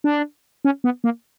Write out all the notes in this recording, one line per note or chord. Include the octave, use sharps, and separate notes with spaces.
D4
C#4
B3
A#3